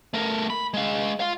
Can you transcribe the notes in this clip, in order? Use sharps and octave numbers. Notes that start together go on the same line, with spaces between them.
A3 A#4
B5
G#3 F5
F4 F5